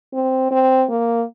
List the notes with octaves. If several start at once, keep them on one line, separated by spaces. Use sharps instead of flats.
C4
C4
A#3